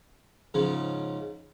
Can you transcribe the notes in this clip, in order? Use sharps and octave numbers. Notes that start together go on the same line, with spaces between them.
G#2 C#3 F3